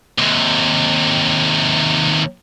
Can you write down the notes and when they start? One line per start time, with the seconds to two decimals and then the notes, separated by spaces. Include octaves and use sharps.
0.19 D#2 C3